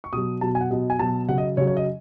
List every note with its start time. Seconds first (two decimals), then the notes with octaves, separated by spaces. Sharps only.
0.04 C#6
0.13 B2 F#3 D#6
0.41 B2 F#3 A5
0.55 G#5
0.61 F#5
0.71 B2 F#3 D#5
0.90 G#5
0.99 B2 F#3 A5
1.29 C#3 F#3 F#5
1.38 D#5
1.57 C#3 F#3 C#5
1.67 C#5
1.77 D#5